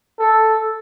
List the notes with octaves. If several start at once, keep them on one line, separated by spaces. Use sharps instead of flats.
A4